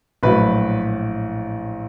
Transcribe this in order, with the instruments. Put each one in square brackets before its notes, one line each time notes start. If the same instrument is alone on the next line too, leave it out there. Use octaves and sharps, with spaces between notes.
[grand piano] A#1 A2 F#3 B4